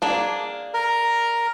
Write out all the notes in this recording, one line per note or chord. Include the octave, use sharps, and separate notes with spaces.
A#3 D4 G#4
A#4